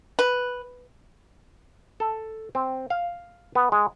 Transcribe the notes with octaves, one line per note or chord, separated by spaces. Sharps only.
B4
A4
C4
F5
B3
G#3